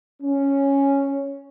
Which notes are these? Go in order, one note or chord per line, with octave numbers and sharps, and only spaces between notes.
C#4